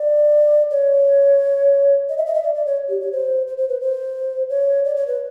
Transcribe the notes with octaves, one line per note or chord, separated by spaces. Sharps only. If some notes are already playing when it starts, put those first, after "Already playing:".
Already playing: D5
C#5
D#5
E5
D#5
E5
D5
D5
C#5
G4
C#5
C5
C5
C5
B4
C5
C#5
D5
C#5
B4